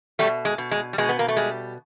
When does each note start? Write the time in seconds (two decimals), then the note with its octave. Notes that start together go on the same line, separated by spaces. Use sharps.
0.19 B2 G3 A3
0.45 G#3
0.58 B2
0.71 G#3
0.93 G3
0.98 B2 G#3
1.09 B3
1.19 A#3
1.28 A3
1.37 G3 G#3